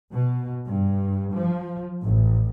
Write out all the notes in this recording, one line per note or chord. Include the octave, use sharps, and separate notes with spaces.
B2
G2
F3
A1